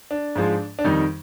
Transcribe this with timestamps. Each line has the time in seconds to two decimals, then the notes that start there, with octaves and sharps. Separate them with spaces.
0.11 D4
0.36 G#2 F3 G#3
0.79 D4
0.84 F2 D#3 G3 D#4